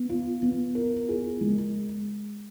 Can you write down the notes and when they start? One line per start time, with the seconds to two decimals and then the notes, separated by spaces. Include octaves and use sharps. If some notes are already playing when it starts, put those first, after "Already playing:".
Already playing: B3
0.09 F4
0.42 B3
0.75 A#4
1.09 G#4
1.41 G#3